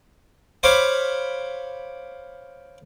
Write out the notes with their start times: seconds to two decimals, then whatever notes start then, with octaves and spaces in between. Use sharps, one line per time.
0.63 C5 C#5 F5 B5 D6